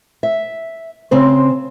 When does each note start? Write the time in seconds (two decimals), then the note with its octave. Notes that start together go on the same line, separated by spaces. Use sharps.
0.23 E5
1.11 C#3 C4 C5